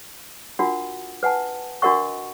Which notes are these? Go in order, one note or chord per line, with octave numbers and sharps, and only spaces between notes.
D4 F4 F#4 A#4 F#5
B4 F#5 G#5 A5
D4 F#4 A#4 D#5 F#5 C#6